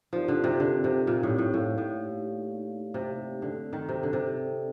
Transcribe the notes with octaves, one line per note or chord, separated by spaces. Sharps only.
F3 C4 D#4 G4 A#4 D5
D3
C3
D3 C4 D#4 G4 A#4 D5
C3
A#2 C4 D#4 G4 A#4 D5
A2
A2
A2 A#3 D#4 G4 D5 F5
A2
A#3 D#4 G4 D5 F5
A#3 D#4 G4 D5 F5
C3 A#3 D#4 G4 D5 F5
D3 C4 D#4 A4 D5
D#3
C3 C4 D#4 A4 D5
D3
C3
C4 D#4 A4 D5